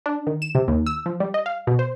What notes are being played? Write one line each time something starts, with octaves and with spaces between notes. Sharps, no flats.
D4
D#3
E7
C3
D#2
E6
F3
G3
D#5
F5
B2
C5